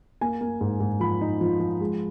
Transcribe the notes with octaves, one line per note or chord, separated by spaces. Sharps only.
A#3 G#5
A#3
G#2
G#2
F3 B5
D#4
F3
F3
G#3